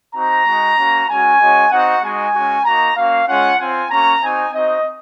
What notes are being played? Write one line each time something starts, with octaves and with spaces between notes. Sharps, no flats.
C4 D#4 F#4 A#5
G#3 D#4 F#4
A#3 C#4 F#4
G#3 C#4 F#4 G#5
G#3 C#4 F#4
C4 D#4 F#4 F#5
G#3 D#4 F#4 G#5
G#3 C#4 F#4
A#3 D#4 F#4 A#5
A#3 C#4 F#4 F5
G#3 C#4 F4 F#5
C4 F4 G#5
A#3 C#4 F#4 A#5
C4 D#4 F#4 G#5
C4 D#4 F#4 D#5